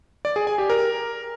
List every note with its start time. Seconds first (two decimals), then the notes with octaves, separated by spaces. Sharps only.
0.25 D5
0.36 G#4
0.47 G#5
0.58 G4
0.70 A#4